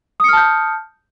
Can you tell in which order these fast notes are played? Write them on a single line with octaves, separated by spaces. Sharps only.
D#6 C#7 F6 A5 G6